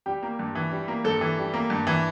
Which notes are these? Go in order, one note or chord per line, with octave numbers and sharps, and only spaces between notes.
G3 G4
A#3
G2
E3
G3
A#3
G2 A4
E3
G3
A#3
G2
E3